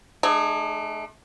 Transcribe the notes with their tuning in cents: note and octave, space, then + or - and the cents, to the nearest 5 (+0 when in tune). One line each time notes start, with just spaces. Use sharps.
A3 -40 D4 +45 G#4 +0